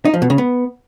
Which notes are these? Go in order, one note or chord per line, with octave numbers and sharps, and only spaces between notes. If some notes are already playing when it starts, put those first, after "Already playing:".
D#4
F3
B2
C#3
B3